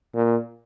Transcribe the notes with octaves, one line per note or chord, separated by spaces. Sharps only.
A#2